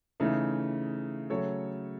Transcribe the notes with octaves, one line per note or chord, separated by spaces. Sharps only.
C#3 E3 A3 D#4
C#3 F#3 A3 A4 C#5